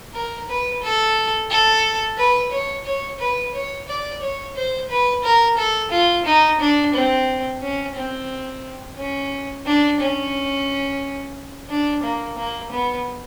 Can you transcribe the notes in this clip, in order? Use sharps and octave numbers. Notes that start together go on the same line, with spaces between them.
A#4
B4
A4
A4
B4
C#5
C#5
B4
C#5
D5
C#5
C5
B4
A#4
A4
F4
D#4
D4
C4
C#4
C4
C#4
D4
C#4
D4
A#3
A#3
B3